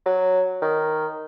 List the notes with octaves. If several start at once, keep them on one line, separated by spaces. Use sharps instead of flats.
F#3
D#3